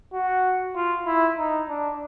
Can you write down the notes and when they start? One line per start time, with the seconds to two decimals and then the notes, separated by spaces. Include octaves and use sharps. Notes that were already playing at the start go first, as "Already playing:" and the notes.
0.13 F#4
0.75 F4
1.06 E4
1.38 D#4
1.69 D4